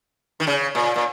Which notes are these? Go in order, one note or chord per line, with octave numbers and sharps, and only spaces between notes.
D#3
C#3
A#2
A#2